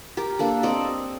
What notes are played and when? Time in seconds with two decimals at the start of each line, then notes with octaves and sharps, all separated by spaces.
0.17 G4 A#4
0.39 A#3 D4 A4
0.63 C4 A4 D5 D#5